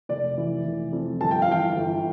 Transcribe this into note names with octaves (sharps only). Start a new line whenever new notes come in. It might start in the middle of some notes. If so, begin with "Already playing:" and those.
F1 D5
E3
F1
F2
G1 A5
G5
F5
E3 G5
G1